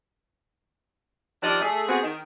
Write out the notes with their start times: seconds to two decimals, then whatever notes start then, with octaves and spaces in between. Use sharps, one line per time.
1.42 D#3 F3 G3 D4 D5 D#5
1.61 A3 G#4
1.89 B3 C4 F#4 G#4
2.03 D#3